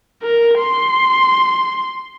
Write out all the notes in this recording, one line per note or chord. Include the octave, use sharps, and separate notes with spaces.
A#4
C6